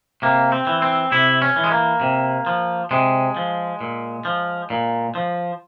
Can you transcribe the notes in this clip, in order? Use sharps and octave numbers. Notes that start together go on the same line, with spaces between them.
C3 A#3
C4
E3
C4
C3 E4
C#4
E3
G#3
A#3
C3
F3
C3 G#3
F3
A#2
F3
A#2
F3